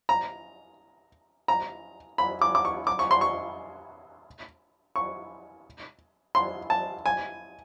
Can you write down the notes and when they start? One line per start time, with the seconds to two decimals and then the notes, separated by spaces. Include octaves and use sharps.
0.09 A#5
1.48 A#5
2.18 B5
2.42 D6
2.55 D6
2.65 C#6
2.87 D6
2.99 C#6
3.11 C6
3.21 C#6
4.96 C#6
6.35 C6
6.70 A5
7.06 G#5